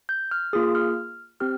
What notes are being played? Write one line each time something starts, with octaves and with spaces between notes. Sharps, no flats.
G6
F6
A#3 F4 G#4 D#6
F6
C4 G4 F6